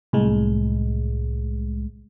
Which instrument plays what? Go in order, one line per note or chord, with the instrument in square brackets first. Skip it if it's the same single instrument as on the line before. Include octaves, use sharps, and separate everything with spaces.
[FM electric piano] C2 A2 G#3